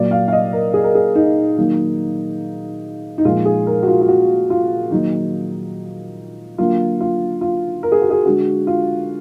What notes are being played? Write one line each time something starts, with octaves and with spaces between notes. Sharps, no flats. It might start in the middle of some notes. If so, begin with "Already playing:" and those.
Already playing: A#2 F#3 A#3 D5
F5
F5
D#5
A#4
G#4
A#4
G#4
D#4
D#3 F#3 A#3
D#4
A#2 F3 G#3 F4
G#4
A#4
F#4
F4
F4
F#4
F4
D#3 F#3 A#3 D#4
D3 F#3 A#3 F4
F4
F4
A#4
G#4
F#4
G#4
D3 G#3 F#4
F4